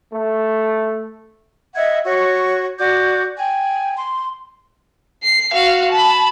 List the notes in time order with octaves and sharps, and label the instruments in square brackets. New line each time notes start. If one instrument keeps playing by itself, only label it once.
[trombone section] A3
[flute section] D#5 E5 F#5 G#6
F#4 C#5 C#6
F#4 D5 D6 G6
G5 G#5
C6
[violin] C7
F#4 F5
A5 B5